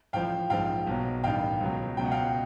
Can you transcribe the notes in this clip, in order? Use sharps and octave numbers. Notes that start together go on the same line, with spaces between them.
A1 A2 F3 F5 G5
A#1 G#2 F3 F5 G5
B1 B2 F#3
A1 G2 D#3 F5 G5
C#2 B2 F#3
C#2 B2 F#3 G5
F#5
F5 G5